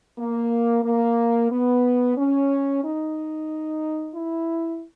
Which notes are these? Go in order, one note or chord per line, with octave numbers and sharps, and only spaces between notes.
A#3
A#3
B3
C#4
D#4
E4